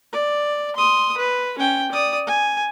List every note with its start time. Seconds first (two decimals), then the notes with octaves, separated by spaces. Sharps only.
0.13 D5
0.76 C6 D#6
1.18 B4
1.58 C#4 G5
1.92 D5 D#6
2.27 G#5